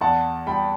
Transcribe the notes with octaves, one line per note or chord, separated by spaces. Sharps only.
E2 F#5 A5
G3 G5 B5